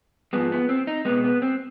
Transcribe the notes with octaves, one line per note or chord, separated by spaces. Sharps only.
G#2 F3 G#3 B3
B3
C4
D#4
B2 G#3 B3
B3
C4